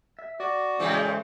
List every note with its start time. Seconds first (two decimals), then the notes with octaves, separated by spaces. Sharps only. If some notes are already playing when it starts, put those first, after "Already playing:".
0.19 E5
0.40 F#4 D5
0.80 A2 C#3 E3 G#3 C#4 C5